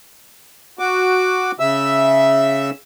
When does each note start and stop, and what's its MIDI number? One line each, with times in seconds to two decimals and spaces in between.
0.79 1.51 66
0.79 1.51 86
1.60 2.70 49
1.60 2.70 76
1.60 2.70 88